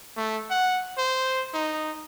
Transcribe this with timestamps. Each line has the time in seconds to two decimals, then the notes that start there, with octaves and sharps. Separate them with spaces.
0.17 A3
0.51 F#5
0.98 C5
1.54 D#4